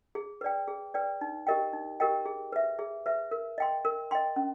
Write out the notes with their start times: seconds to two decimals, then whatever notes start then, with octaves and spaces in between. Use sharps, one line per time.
0.15 G#4
0.41 B4 D5 G5
0.68 G#4
0.94 B4 D5 G5
1.21 D#4
1.47 G4 A#4 D#5 G5
1.73 D#4
2.00 G4 A#4 D#5 G5
2.26 G#4
2.52 B4 E5
2.79 G#4
3.06 B4 E5
3.31 A#4
3.58 D#5 G5 C6
3.85 A#4
4.11 D#5 G5 C6
4.36 C#4